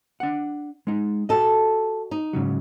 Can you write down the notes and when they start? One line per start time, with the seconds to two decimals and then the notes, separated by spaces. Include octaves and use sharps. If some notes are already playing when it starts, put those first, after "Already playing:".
0.20 D4 F#5
0.87 G#3 D#4
1.29 F#4 G4 A4 D#5
2.11 D#4
2.33 G#2 C#3 F#3